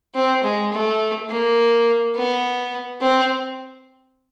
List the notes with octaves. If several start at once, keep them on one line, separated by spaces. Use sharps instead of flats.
C4
G#3
A3
A#3
B3
C4